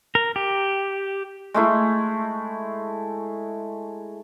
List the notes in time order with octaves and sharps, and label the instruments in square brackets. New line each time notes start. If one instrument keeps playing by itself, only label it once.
[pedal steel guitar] A#4
G4
[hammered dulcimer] G#3 A3 E4